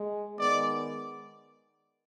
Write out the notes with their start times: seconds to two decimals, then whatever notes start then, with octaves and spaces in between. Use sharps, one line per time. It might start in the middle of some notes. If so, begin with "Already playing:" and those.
Already playing: G#3
0.37 D#3 G#3 B3 D5